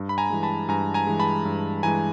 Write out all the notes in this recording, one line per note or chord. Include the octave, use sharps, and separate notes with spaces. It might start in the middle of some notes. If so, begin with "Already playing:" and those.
Already playing: G2
B5
G#5 A#5
E3 G#3
A5 B5
G2 G#5 A#5
G#5 A#5
E3 G#3
A5 B5
G2
E3 G#3 G#5 A#5